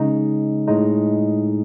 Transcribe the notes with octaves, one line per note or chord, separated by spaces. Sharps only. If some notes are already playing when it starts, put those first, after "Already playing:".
Already playing: C#3 G#3 D#4
A2 G#3 D#4